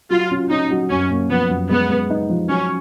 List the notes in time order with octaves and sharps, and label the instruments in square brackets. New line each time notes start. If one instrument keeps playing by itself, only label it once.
[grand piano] F#3 [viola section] F4
[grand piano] C#4
[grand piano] C#4 [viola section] D#4
[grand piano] F#3
[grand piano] F#2 [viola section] C#4
[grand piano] A#3
[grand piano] F3 [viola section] B3
[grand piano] F#2
[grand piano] G#3 [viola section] B3
[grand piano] G#3
D#4
F3
[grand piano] F#3 [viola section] C#4